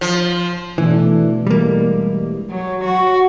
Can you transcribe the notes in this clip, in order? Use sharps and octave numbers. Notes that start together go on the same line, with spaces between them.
F3
B2 E3 A3 D4
E3 G3 G#3 A#3
F#3
F#4